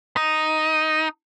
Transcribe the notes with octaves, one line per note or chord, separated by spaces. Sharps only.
D#4